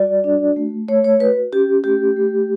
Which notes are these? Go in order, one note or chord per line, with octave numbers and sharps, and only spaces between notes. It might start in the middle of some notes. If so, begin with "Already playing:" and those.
Already playing: G3 F#4 D5
D4
A3
A3 C#5
C#5
F#4 B4
C#4 G4
A3 G4
A3